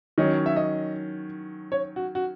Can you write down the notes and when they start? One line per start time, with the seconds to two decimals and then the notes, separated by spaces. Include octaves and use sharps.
0.18 D#3 F#3 C#4 D#5
0.46 E5
0.56 D#5
1.72 C#5
1.96 F#4
2.15 F#4